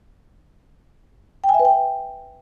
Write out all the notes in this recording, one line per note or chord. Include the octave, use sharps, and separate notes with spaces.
G5
G#5
E5
B4
G5